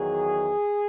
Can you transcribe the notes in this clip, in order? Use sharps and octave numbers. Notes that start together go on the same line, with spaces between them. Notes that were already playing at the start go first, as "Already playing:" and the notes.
Already playing: E2 D#3 F#3 G#4